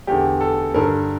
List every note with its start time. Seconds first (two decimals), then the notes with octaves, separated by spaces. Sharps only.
0.07 E2 D3 G4
0.41 A4
0.74 G2 D3 A#4